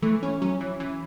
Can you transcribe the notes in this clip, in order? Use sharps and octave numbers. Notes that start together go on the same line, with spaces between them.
E3 A3
C#4
F#3 C#4
E3
E3